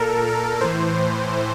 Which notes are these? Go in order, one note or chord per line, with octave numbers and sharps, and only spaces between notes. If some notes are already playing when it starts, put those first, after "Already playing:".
Already playing: A#2 A4 A#4
A#4
A2 E3 C5